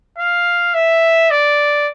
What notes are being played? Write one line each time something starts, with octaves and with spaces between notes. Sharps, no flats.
F5
E5
D5